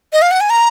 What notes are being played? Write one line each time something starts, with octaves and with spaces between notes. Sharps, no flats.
D#5
F5
F#5
G#5
A#5